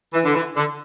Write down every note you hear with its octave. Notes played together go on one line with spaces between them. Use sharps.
E3
D3
E3
D3